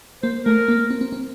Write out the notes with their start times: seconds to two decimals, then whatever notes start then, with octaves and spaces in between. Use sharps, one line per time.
0.23 A#3 C5
0.45 A3 A#4
0.68 A#3
0.90 C4
1.01 C4
1.13 C4